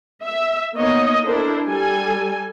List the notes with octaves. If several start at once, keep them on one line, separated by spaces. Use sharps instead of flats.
E5
A#3 B3 D#4 C#5 D#5
D4 E4 A4 A#4 C5
G3 A4 G#5